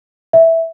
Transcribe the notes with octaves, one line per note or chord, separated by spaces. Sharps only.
E5